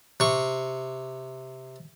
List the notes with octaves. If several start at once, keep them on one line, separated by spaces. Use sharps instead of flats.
C3 C#6